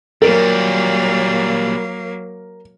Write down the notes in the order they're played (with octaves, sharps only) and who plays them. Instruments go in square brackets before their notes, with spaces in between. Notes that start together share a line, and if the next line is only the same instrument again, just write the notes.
[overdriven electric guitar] A#2 G3 [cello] F#3 A#3 [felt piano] A#4